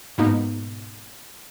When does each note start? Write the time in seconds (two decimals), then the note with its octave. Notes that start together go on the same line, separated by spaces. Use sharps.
0.18 G#2 B2 A#3 B3 D#4